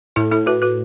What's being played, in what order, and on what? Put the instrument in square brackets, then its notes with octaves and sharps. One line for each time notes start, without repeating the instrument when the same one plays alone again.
[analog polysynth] A2 [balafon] E4 A4
[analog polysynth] A2 [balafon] E4 A4
[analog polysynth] A2 [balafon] F#4 B4
[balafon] F#4 B4